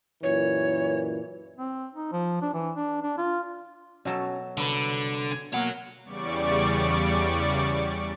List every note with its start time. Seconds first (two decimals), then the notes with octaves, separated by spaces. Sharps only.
0.23 F#2 A#2 E3 C#5
1.57 C4
1.94 D#4
2.12 F3
2.42 D4
2.54 E3
2.77 D4
3.02 D4
3.18 F4
4.05 B2 F#3 C#4 A4
4.57 C2 D3 B4
5.31 G#5
5.53 B2 A#3 C#5 F#5
6.05 E2 C#3 G3 D5 C#6 D6